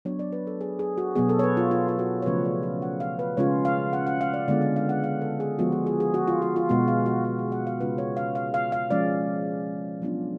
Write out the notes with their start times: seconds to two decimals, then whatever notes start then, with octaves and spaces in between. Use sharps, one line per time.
0.05 F#3 B3 D4 C#5
0.19 D5
0.33 B4
0.47 A4
0.61 G#4
0.79 G#4
0.98 F#4
1.15 B2 F#3 B3 G#4
1.29 A4
1.39 C#5
1.43 B4
1.57 F4
1.71 F4
1.88 F4
1.99 F#4
2.22 C#5
2.26 C#3 F3 A3 C#4 B4
2.45 D5
2.63 F5
2.82 F#5
3.00 F5
3.19 B4
3.37 C#3 G#3 C#4 F4 C#5
3.65 F5
3.93 F#5
4.07 F#5
4.21 F5
4.34 D5
4.48 D3 G#3 B3 D4 F4 D5
4.62 F5
4.76 F5
4.89 F#5
5.04 F5
5.21 A4
5.40 G#4
5.59 F3 G#3 B3 F4 F#4
5.72 G#4
5.87 G#4
6.00 G#4
6.14 F#4
6.27 F4
6.42 F#4
6.56 F4
6.69 B2 G#3 B3 F#4
6.88 F5
7.06 F#4
7.25 F#4
7.39 G#4
7.52 F#5
7.67 F5
7.80 C#3 G#3 C#4 F4 B4
7.98 C#5
8.17 F5
8.35 F5
8.54 F5
8.72 F5
8.91 F3 G#3 C#4 D5
10.02 F#3 B3 D4 F4